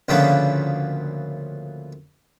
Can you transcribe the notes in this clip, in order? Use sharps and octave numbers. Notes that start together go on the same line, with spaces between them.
D2 A#2 C#3 F3 A#3 B3